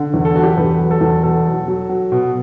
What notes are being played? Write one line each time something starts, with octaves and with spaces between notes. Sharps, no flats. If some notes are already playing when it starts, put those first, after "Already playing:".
Already playing: D3
E2
A4
F#3 F#4
G4
A4
E2 B4
F#3
A4
E2
B2 A4
F#3
F#3
F#3
B2